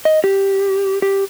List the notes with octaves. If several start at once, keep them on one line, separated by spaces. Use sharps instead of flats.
D#5
G4
G4